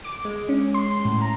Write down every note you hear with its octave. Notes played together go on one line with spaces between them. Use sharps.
D6
G#3
C#4
C6
A2
A#5